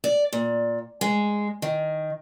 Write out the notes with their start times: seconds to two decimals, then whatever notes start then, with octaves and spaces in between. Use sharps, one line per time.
0.04 D5
0.33 A#2
1.01 G#3
1.62 D#3